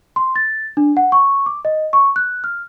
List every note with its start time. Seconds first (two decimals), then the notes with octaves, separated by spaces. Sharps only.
0.16 C6
0.36 A6
0.77 D4
0.97 F#5
1.12 C#6
1.46 D6
1.65 D#5
1.93 C#6
2.16 F#6
2.44 F6